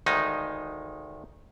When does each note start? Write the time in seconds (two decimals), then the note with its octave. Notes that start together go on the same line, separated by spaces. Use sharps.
0.06 D2 D#3 G#3 D#4